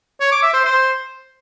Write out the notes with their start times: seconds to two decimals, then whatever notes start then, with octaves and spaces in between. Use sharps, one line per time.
0.21 C#5
0.32 D6
0.43 E5
0.54 C5
0.65 C5